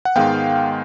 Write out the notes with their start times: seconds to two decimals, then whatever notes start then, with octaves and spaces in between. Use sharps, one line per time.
0.05 F#5
0.16 G#2 D#3 G#3 B3 F5 G5